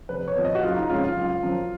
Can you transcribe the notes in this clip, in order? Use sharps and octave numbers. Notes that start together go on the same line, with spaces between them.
F1 B4
C#5
F2 F3 B3
D#5
F#4
F#1 F4
D#4
F2 C#3 G#3 C#4 F4
F4
F#1
F#2 F3